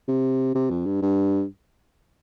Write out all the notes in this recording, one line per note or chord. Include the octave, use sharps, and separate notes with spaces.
C3
C3
F2
G2
G2